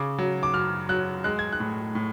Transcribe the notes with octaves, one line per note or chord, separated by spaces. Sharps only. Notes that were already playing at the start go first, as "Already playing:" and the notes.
Already playing: C#3 D6
F#3
D6
F#2 F6
F#3 F#6
G#3 F#6
G#6
F#6
A2
A2